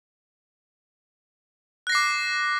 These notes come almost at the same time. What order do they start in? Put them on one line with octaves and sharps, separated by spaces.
F#6 A#6 C7 D6